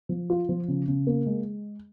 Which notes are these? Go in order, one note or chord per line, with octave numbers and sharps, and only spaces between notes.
F3
F4
F3
C#3
C#3
A#3
G#3